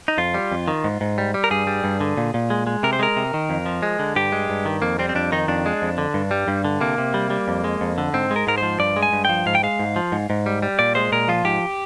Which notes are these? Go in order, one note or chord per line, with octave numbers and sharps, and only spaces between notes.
D#4
F2 F4
G3
F2
D#3
G#2
G#2
G3
G3
A#4
G2 G#4
G3
G2
D3
A#2
A#2
G#3
G#3
C3 A#4
C5
G#3 A#4
C3
D#3
F2
F3
G#3
D3
G2 G4
G#3
G2
D#3
F2 A#3
G3 C4
C4
F2 D4
D#3 D#4
F2 D4
G#3
F2
D3
G2
G3
G2
D3
C3 A#3
C3
G3
G3
F2
G#3
F2
D3
G#2 C4
G#3
A#4
G#2 A#4
C5
F3
G2 D5
G#3
G#5
G2
F3 G5
G#2 F5
G5
G#3 F5
G#2
F3
G#2
G#2
G3
G3
A#2 D5
G#3 C5
A#2 A#4
F3 F4
G#2 G4